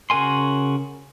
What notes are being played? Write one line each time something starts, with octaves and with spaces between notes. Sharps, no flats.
C#3 F#4 A#4 G#5 C6